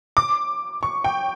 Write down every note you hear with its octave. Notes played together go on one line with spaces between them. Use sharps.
D6
C#6
G5